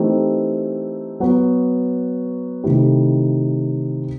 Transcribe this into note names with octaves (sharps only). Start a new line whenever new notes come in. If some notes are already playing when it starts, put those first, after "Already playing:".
Already playing: E3 A3 C4 D#4 G4
F#3 B3 F#4
C3 D#3 A3 E4 G4